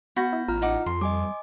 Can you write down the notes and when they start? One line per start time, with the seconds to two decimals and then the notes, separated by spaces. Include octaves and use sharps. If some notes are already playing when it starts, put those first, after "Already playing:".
0.16 B3 F#4 B5 G6 A#6
0.33 E4
0.48 A1 F4 A#5 F6
0.62 D#4 F#5 D6
0.86 F2 C6
1.01 G3 D#5 G#5 D6